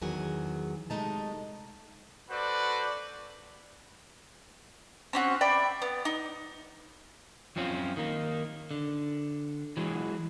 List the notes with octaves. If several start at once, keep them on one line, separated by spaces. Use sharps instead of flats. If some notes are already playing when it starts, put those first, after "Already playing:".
E2 D#3 F#3 G#4 G#5
C3 G#3 A3 D#4 A5
F#4 A4 B4 C5 D5
C4 C#4 F#4
D5 E5 G5 B5
B3
D#4
F#2 F3 C4 C#4 F4
D#3 A#3
D3
E3 F#3 G#3